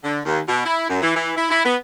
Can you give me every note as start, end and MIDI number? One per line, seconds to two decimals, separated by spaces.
0.04 0.20 50
0.25 0.39 39
0.49 0.63 47
0.64 0.87 64
0.89 1.00 42
1.02 1.12 52
1.16 1.31 52
1.36 1.48 64
1.50 1.62 64
1.64 1.76 59